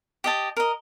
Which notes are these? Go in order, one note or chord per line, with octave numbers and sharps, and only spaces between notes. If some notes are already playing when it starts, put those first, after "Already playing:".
G4 D#5 A5
A#4 D#5